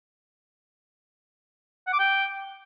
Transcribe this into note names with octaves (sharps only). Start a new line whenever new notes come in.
F#5
D6
G5